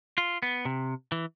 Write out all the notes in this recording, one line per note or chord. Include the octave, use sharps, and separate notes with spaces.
F4
B3
C3
E3